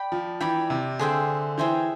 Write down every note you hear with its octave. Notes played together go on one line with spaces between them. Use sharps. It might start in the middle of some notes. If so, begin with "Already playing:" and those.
Already playing: D5 G5 B5
F3
E3 D5 G5 B5
C3
D3 G#4 C5 E5 G5
E3 G#4 C5 E5 G5